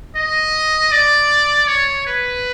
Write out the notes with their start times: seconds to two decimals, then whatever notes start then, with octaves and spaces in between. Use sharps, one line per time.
0.16 D#5
0.91 D5
1.68 C#5
2.07 B4